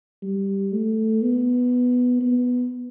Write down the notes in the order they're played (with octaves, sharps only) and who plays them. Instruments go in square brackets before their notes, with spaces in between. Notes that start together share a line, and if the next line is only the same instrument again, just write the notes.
[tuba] G3
A3
B3
B3